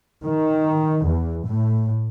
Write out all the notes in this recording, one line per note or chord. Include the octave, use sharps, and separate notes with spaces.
D#3
E2
A2